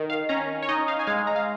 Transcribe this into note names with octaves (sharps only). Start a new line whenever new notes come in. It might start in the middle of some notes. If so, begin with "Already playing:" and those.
Already playing: D#3
F5
C#4 A#5
C#5
D#4 D#5
F5
G#5
G#3 F5
A#5
F5